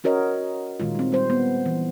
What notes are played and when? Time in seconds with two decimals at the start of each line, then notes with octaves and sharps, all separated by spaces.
0.04 C#4 F#4 A#4 C#5 D#5
0.80 A#2 D#3 G#3 F4
0.95 G3 C4
1.12 G3 C5
1.30 B3
1.66 E3